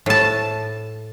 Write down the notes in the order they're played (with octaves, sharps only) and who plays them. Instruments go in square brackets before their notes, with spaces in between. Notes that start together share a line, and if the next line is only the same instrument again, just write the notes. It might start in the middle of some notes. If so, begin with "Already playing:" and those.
[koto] A2 A5